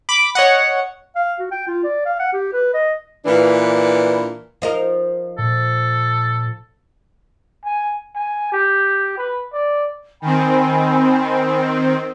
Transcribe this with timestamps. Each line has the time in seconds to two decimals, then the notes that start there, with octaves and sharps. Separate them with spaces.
0.09 B5 D6 B6
0.35 C#5 D#5 F#5
1.16 F5
1.39 F#4
1.51 G5
1.67 F4
1.84 D5
2.06 F5
2.20 F#5
2.33 G4
2.53 B4
2.74 D#5
3.26 A#2 E3 D4 B4
4.62 F3 D#4 A#4
5.38 A#2 A4
7.64 G#5
8.15 G#5
8.52 G4
9.17 B4
9.53 D5
10.22 D#3 C4 G5 G#5 B5